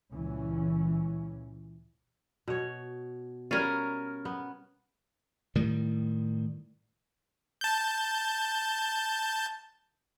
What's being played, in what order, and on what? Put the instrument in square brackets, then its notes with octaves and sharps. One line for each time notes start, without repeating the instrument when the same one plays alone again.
[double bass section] C#2 A#2 E3 C#4
[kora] B2 C#5
[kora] G3 B4 F5 [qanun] C#4 A#4 [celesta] F6 G#6 A6
[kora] B3
[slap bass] A2 D#3 G3
[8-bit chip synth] A5 G6